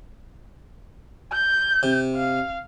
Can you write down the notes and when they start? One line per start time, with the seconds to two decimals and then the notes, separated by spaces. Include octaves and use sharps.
1.32 G6
1.83 C3
2.16 F5